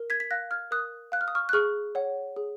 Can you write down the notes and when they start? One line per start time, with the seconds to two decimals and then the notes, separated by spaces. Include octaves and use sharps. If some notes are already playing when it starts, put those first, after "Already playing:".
Already playing: A#4
0.10 G#6 B6
0.20 B6
0.31 F5 F#6 A#6
0.51 F6 G#6
0.71 A#4 D#6 F#6
1.12 F5 F#6
1.21 F6
1.28 D#6
1.35 C#6 F6
1.49 F#6
1.53 G#4 C#6 F6
1.95 C#5 F#5
2.36 G#4